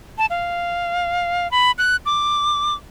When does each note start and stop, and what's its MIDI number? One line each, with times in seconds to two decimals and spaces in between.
0.18 0.26 81
0.30 1.50 77
1.51 1.71 83
1.78 1.96 90
2.06 2.74 86